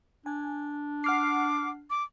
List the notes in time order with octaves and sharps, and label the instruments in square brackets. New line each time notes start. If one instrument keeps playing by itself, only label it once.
[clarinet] D4 [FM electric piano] G#5
[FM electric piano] F#5 F6 C7 [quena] D6
[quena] D6